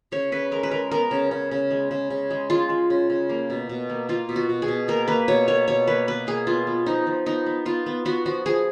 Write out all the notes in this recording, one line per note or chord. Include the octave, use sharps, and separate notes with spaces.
C#3 C#5
C#3 B4
G#3 A#4
B4
G#3 A#4
B3 A#4
C#3
C#3
C#3
G#3
C#3
C#3
G#3
G#3 F4
G#3
C#3
C#3
A#3
B2
B2
A#3
A#3 F4
B2
F#4
B2
G#4
B2
A#3 A#4
A#3 B4
B2 C#5
A#3 C#5
B2 C#5
A#3 B4
B2 B4
A#3 G#4
B3 F4
B3
F3 D#4
F3
B3 D#4
B3
B3 F4
B3
B3 F#4
F3 F#4
F3 G#4